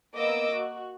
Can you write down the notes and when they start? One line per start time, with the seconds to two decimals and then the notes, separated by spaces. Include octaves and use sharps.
0.13 A#3 B3 D#5 D6 E6
0.52 F#4